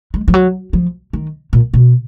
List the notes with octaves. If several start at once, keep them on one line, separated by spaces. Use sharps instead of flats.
G#3
F3
F#3
F3
D#3
A#2
B2